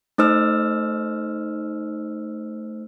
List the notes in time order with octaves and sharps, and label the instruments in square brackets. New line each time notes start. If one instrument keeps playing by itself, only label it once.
[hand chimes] A3 D#4 C5 E6 F6